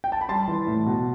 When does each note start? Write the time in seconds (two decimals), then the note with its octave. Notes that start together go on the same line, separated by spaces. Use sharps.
0.04 G5
0.12 A5
0.21 B5
0.29 G3 A5 C6
0.48 E3
0.67 A2
0.86 B2